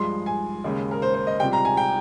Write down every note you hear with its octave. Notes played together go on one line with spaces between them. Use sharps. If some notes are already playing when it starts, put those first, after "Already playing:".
Already playing: G2 F3 G#3 C6
G#5
D#2 C#3 G#3
A#4
C5
C5
D#5
C#2 C3 G3 G5
A#5
G#5
G5